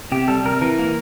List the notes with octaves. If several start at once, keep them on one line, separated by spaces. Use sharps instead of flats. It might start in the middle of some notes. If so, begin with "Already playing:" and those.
C3 G4
G3 A4
C3 A#4
E3 A#4
A#3